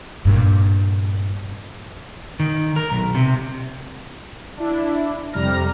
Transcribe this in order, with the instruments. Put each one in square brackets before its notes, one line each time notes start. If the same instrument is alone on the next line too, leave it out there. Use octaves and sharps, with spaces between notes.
[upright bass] G2 A#2
[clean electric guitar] D#3
A#4
B1
C3
[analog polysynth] D4 E4
F2 C3 G3 A#5 F6 A#6